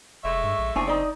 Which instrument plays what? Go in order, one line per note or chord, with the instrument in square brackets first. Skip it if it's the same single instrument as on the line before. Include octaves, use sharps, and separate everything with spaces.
[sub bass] F1 [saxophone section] G#3 A3 E5 [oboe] C#6
[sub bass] G2
A#1
[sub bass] F#1 [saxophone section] F3 C4 [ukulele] D4 E4 G#5 [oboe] C#6
[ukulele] D#4 D5 [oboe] D#5